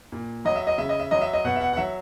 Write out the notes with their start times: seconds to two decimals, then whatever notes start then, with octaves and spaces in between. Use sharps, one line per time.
0.12 A#2
0.45 F#3 D#5
0.56 E5
0.67 D#5
0.78 C#3 E5
0.89 D#5
1.00 E5
1.11 F#3 D#5
1.22 E5
1.33 D#5
1.44 B2 F#5
1.56 E5
1.61 F#5
1.73 F#5
1.77 F#3 E5